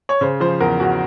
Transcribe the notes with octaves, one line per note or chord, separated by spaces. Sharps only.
C#5
C#3 C5
F3 C5
E2 A#4
E2 F#4